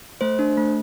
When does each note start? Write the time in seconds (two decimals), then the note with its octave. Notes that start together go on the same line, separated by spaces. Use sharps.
0.21 A3 C5
0.39 D4
0.57 A3